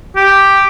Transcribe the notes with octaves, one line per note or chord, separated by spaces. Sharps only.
G4